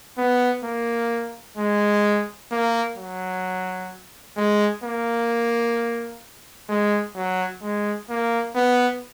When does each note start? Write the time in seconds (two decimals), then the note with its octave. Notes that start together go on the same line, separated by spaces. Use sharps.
0.18 B3
0.64 A#3
1.57 G#3
2.51 A#3
2.97 F#3
4.37 G#3
4.84 A#3
6.69 G#3
7.16 F#3
7.62 G#3
8.09 A#3
8.55 B3